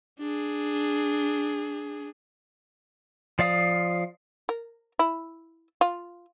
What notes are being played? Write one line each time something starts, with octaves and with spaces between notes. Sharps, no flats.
D4 G#4
F3 D5 F5 D#6
A#4
E4
F4